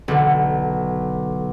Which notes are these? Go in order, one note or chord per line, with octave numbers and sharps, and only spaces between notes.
B1 D3